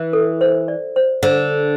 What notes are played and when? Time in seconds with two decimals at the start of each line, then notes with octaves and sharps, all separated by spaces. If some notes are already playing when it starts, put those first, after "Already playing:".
Already playing: E3
0.13 A4
0.41 C5
0.68 D5
0.96 C5
1.23 D3 C5